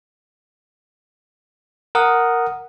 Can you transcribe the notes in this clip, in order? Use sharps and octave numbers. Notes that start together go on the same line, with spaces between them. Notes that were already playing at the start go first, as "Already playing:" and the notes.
A#4 F#5 D#6